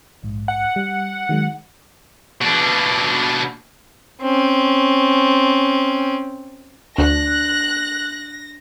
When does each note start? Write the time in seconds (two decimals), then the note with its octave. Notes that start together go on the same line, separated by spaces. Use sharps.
0.23 A#1 G#2
0.48 F#5
0.76 G3
1.29 D#3 F#3 G#3
2.42 B2 D4
4.22 C4 C#4
6.98 D2 D4 F#6 A#6